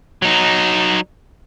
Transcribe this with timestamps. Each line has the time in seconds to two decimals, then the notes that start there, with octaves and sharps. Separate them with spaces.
0.22 F#3 D#4